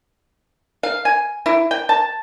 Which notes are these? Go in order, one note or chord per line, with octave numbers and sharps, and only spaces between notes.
F5
G#5
E4
G5
A5